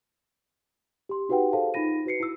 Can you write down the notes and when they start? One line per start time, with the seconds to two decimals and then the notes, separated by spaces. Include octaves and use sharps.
1.09 G4 C6
1.29 D#4 F#4 G4 B4 F#5 G5
1.53 G#4 A4 C5 F5 A5
1.74 D#4 F4 B5 A#6 D#7
2.06 F#4 B4 C7 C#7
2.20 E4 E6